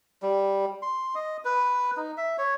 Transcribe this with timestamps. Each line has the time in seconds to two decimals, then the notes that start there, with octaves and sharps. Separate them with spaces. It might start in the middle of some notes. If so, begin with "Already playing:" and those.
0.23 G3
0.82 C6
1.15 D#5
1.45 B4
1.97 D#4
2.17 E5
2.38 C#5